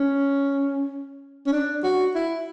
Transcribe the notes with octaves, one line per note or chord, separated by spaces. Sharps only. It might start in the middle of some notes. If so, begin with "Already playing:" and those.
Already playing: C#4
C#4
D4
F#4
E4